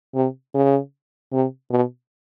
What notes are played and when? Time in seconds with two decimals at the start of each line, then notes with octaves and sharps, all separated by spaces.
0.15 C3
0.54 C#3
1.33 C3
1.70 B2